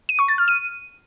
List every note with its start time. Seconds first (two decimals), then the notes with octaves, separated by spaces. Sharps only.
0.09 D#7
0.19 C#6
0.28 A6
0.38 F6
0.48 D#7